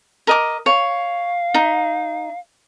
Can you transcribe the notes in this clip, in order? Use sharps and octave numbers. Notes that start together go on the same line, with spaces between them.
A#4 D#5 D6
C#5 F5
D#4